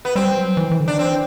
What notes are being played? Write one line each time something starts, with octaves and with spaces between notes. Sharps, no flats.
B3
G3 C4
F#3
E3
E3
D3
E3 D4
C4